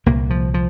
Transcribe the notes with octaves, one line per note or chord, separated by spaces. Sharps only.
C2 A#2 A#3
F3
F3